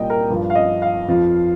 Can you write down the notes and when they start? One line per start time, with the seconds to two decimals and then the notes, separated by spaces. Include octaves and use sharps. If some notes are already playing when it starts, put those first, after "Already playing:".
Already playing: C2 A#2 G3 D#5 G5
0.10 A#4
0.30 G2 F3
0.50 F5
0.55 D#5
0.82 F5
1.08 F2 F3